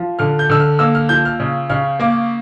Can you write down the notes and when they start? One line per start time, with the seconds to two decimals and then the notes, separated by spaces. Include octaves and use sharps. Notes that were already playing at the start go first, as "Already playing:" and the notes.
Already playing: F3
0.19 D3 F6
0.39 G6
0.50 D3 E6
0.60 F6
0.79 A#3 E6
0.95 F6
1.09 F3 G6
1.25 F6
1.40 C#3
1.70 C#3 F6
2.00 A#3 D6